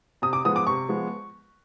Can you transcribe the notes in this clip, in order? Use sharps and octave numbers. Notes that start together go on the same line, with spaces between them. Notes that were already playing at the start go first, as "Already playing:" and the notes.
C3 D#6
D6
F3 G#3 B3 D#6
D6
C3 C#6
F3 G#3 B3